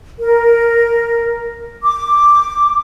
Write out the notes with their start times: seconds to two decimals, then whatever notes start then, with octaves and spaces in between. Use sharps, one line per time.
0.20 A#4
1.83 D6